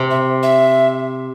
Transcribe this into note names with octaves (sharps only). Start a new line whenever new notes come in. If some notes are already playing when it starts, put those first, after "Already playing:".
Already playing: C3
E5
E5